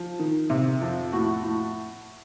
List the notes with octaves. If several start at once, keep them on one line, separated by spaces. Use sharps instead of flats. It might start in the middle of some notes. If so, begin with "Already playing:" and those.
Already playing: F3
D#3
C3
F2
A2 F#4
A2